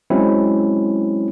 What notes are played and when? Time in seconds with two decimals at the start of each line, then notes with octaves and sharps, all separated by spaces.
0.10 F#3 G#3 C4 C#4 E4